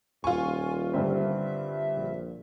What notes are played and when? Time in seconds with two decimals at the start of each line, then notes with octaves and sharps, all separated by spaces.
0.24 D#1 F4 G#5 C#6
0.93 G2 D3 C4 E5
1.96 A#1